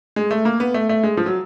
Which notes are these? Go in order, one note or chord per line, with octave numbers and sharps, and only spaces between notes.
G#3
A3
A#3
B3
A3
A3
G#3
F3
F#3